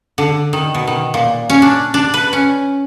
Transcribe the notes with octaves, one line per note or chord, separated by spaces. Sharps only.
D3
D#3
B2
D#3
A#2
C#4
D4
D4
B4
C#4